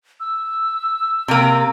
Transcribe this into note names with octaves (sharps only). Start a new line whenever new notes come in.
E6
C3 A#3